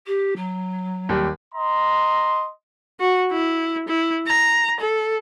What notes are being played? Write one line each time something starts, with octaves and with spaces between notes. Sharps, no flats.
G4
F#3
D#2 G3
D#5 A#5 C6
F#4
E4
E4
A#5
A4